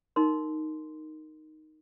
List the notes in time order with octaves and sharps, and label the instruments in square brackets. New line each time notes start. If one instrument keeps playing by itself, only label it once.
[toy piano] D#4 A#4 C6